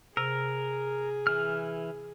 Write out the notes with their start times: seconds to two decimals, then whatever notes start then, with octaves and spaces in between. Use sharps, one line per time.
0.17 C3 G#4 A#4
1.27 E3 F6